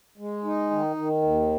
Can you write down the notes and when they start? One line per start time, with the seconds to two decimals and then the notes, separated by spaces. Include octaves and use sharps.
0.18 G#3
0.44 D#4
0.71 D#3
0.96 D#3
1.22 D#2